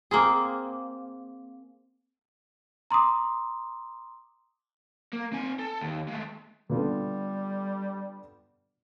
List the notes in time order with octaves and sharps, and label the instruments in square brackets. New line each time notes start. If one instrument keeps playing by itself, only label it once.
[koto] A#3 C4 G#4
[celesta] A#5 C6 D6 D#6
[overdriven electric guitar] A#3
C4 G#5
A4
D#2
G#3 A3
[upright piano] D3 B3 F4 [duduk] G3